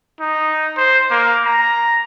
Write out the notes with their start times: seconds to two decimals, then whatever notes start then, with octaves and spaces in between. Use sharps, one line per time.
0.20 D#4
0.77 C5
1.11 A#3
1.46 A#5